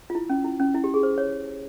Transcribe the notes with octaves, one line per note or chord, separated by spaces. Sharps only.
F4
E4
C#4
E4
C#4
E4
G4
G#4
C5
C#5